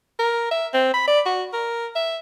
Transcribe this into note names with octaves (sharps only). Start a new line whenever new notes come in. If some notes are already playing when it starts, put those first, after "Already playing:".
A#4
E5
C4
B5
D5
F#4
A#4
E5